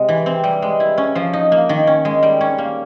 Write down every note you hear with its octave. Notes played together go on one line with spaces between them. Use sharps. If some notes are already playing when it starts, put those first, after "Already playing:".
Already playing: C3 G#3
E3
C4
G3
G#3
E4
C#4
F3
D#4
A#3
D#3
C#4
G#3
G3
C#4
A#3